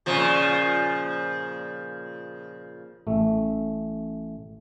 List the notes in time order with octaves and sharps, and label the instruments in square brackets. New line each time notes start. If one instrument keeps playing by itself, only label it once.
[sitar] A#2 C#3 F3
[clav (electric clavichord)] A1 A3